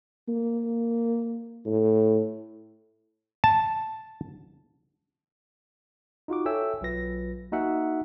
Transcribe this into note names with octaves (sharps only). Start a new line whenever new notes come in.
A#3
A2
A5
D#4 F4 F#4 D6
A4 C#5 E5 G5 G#5 E6
B1 F#3 F4 B4 A#6
A#3 D#4 F#4 E5 F#5 G#5